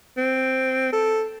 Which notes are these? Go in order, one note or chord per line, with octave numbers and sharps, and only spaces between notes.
C4
A4